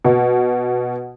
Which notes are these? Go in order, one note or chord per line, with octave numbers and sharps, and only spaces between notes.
B2